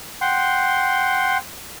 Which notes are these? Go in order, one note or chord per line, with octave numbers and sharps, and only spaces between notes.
F#5 G5 C6